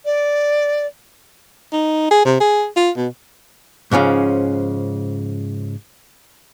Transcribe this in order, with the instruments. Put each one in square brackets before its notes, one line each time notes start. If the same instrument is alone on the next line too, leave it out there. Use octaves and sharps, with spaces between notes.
[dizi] D5
[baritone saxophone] D#4
G#4
C3
G#4
F4
B2
[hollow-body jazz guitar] G#2 C#3 F3 C#4